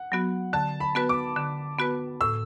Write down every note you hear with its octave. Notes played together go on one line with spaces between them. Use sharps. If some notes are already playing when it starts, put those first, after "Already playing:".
Already playing: F#5
F#3 B3 F#4
D3 A5
B5
B3 F#4 B4
D6
D3
B3 F#4 B4
A2 E6